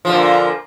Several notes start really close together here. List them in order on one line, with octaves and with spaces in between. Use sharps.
F3 D3 A#2